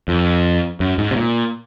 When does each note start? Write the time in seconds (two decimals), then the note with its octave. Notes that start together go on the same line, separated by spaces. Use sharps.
0.08 F2
0.80 F#2
0.98 G#2
1.11 C3
1.16 A#2